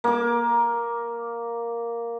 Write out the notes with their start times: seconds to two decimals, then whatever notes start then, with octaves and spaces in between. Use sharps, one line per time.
0.04 A#3 D6